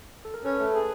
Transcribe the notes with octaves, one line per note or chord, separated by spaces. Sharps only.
A4
A#4
C#4 A4 B4
A3
G#4